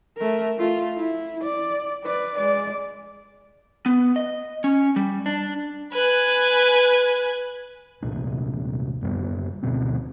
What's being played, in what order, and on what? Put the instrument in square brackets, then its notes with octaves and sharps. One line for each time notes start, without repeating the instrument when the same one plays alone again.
[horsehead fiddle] A3 A#4
A3 F4
E4
D5
B4 D5
G#3 D5
[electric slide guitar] B3
D#5
C#4
G3
D4
[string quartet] B4 G#5 F#6
[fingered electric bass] D#1 C2 A#2 D4
F#1 F#2 G3 B3
D2 B2 C4 C#4